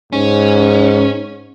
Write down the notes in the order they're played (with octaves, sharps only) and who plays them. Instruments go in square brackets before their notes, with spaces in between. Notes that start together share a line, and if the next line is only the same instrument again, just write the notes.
[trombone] G#2 [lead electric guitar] C#4